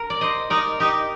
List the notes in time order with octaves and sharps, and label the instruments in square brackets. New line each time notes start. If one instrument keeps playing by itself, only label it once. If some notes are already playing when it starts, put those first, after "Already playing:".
Already playing: [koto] A#4
D5
C5 D#5
[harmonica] D#4 [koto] A#4 D5
[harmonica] D#4 [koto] G4 A#4